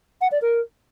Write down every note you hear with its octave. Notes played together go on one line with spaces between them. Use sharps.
F#5
D5
A#4